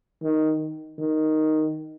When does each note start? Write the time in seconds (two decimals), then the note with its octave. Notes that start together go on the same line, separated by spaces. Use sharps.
0.23 D#3
0.99 D#3